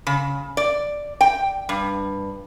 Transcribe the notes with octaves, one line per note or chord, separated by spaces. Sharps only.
C#3
D5
G5
G2